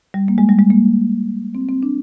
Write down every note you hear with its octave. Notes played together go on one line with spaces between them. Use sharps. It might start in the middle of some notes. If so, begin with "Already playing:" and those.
G3
A#3
G#3
G3
G#3
A#3
C4
C4
D4